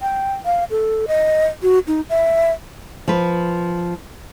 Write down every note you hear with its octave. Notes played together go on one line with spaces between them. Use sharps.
G5
F5
A4
D#5
F#4
D#4
E5
F3 B4